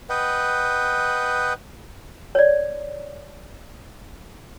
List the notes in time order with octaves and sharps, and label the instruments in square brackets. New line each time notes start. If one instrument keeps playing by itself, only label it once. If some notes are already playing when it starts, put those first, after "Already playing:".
[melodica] B4 D#5 F#5 G5
[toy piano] C#5 D5